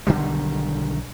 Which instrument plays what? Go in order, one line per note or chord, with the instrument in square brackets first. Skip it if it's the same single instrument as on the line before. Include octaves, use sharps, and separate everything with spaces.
[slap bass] B1 D3 D#3 G3